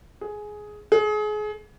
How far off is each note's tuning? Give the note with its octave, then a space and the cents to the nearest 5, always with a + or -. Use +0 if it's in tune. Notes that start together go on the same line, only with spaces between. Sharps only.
G#4 +10
G#4 +30